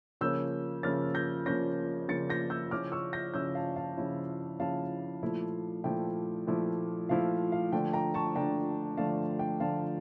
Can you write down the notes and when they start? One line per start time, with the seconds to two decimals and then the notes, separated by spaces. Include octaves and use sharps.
0.21 C#3 F3 A#3 C#4 E6 G6
0.83 C#3 F3 A#3 C#4 F6 A6
1.15 G6 A#6
1.46 C#3 F3 A#3 C#4 G6 A#6
2.08 C#3 F3 A#3 C#4 A6 C#7
2.30 G6 A#6
2.50 E6 G6
2.71 C#3 F3 C#4 E4 D6 F6
2.92 C#6 E6
3.13 G6 A#6
3.34 C#3 F3 C#4 E4 E6 G6
3.55 F5 A5
3.76 F5 A5
3.97 C#3 F3 C#4 E4
4.60 C#3 F3 C#4 E4 F5 A5
5.23 A#2 F3 A3 E4
5.84 A#2 F3 A3 E4 G5
6.47 A#2 F3 A3 E4
7.09 A#2 F3 A3 E4 F5
7.52 F5
7.72 D3 F3 A3 D4 G5
7.93 G5 A#5
8.14 A5 C#6
8.35 D3 F3 A3 D4 G5 A#5
8.97 D3 F3 A3 D4 F5 A5
9.39 G5
9.60 D3 F3 A3 D4 F5 A5